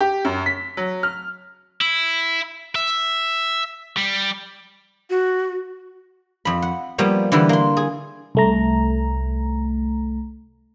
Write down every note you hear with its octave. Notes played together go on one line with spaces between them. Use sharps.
G4
F#2
B6
F#3
F6
E4
E5
G3
F#4
F2 B5
F#5
F3 G3 A#3 B3
D3 E3 G3 E4
A#3 C6
G#4
C2 A3 A#5